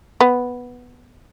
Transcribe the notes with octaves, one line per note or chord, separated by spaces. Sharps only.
B3